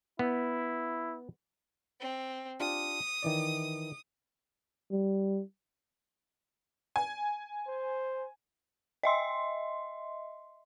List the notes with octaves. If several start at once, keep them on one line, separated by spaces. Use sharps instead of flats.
B3 E4
C4
D4 F4 G4 D#6
D#3 E3 D5
G3
G#5
C5
D#5 E5 C6